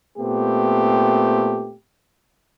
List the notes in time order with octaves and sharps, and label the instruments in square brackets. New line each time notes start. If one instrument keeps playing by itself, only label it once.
[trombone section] A#2 A3 B3 C4 G4